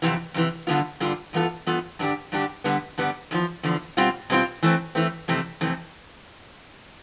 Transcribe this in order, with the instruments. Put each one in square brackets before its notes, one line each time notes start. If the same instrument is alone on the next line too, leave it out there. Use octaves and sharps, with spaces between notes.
[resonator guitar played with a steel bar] F2 C3 E3
F2 C3 E3
G2 D3 G3 B3 F4
G2 D3 G3 F4
G2 E3 B3 F4 A4
G2 E3 B3 F4 A4
G2 D3 G3 D4 G4
G2 D3 G3 D4 G4
G2 D3 G3 B3
G2 D3 G3 B3
E2 D3 F3
E2 D3 F3
B2 G3 C4 F4
B2 G3 C4 F4
E3 A3 C4
E3 A3 C4
F2 C3 E3 A3 C4
F2 C3 E3 A3 C4